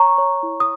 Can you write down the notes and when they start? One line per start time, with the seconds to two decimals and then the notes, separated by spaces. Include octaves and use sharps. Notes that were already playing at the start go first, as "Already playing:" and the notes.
Already playing: C#5 A#5 C#6
0.18 C#5
0.43 E4
0.60 D#6